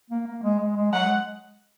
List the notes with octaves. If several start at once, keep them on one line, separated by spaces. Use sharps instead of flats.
A#3
A#3
G#3
G#3
G#3
F#3 F#5
G#3